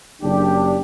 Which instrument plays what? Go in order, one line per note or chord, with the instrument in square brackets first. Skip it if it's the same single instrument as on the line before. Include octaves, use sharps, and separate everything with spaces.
[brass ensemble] F#1 D4 G4